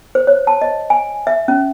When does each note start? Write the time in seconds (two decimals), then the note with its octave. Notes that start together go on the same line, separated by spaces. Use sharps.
0.15 C5
0.27 C#5
0.47 A5
0.62 D#5
0.90 G#5
1.27 E5
1.48 C#4